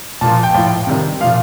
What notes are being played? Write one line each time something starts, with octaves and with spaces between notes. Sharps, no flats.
A#2 F3 A5
G5
A2 F3
C3 D#3 G3
A#2 F3 F5